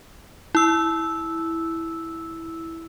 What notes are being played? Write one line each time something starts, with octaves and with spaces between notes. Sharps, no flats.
E4 E6